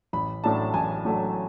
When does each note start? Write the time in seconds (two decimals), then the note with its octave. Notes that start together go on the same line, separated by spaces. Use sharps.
0.13 A1 B5
0.44 A2 F#3 A3 D4 A5
0.74 A1 G#5
1.05 A2 F#3 A3 D4